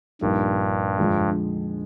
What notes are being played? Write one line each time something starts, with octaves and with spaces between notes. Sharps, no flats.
A#1 G2 A#2 G3 A#3 D#4
F2 D3 F3 G#3